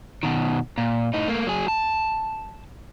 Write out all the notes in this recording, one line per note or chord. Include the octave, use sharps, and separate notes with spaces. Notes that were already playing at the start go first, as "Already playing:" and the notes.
B2 D#3
A#2
A2 D#4
A3 A#3
F#3 G#4
A5